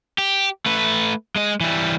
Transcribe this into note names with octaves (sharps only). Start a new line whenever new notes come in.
G4
A3 B4
G#3 D#5
E3 G3